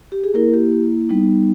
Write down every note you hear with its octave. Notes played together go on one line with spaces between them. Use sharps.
G4
G#4
A#3 E4 A#4
G4
G3 B3 D#4